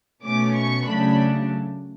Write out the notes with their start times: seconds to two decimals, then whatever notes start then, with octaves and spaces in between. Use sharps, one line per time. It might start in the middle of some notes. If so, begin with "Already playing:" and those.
0.24 B2 A3 C#4 D6
0.55 C#6
0.85 C#3 F#3 A3 D4 B5